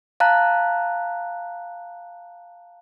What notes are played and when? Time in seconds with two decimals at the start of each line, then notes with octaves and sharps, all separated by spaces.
0.20 F5 A5 A#5 F#6